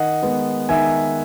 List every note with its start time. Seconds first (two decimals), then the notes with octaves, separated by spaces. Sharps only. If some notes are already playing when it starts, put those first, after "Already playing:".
Already playing: D#3 D#5 F#5
0.22 G#3 B3
0.69 D#3 E5 G#5